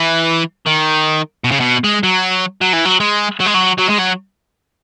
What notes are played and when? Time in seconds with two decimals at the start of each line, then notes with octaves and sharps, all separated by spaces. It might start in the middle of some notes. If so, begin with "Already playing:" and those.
Already playing: E3
0.66 D#3
1.44 B2
1.52 C#3
1.60 B2
1.84 G#3
2.03 F#3
2.61 F#3
2.73 E3
2.85 F#3
3.00 G#3
3.40 F#3
3.46 G#3
3.54 F#3
3.79 F#3
3.90 G#3
3.99 F#3